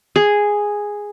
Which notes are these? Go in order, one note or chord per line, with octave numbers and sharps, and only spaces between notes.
G#4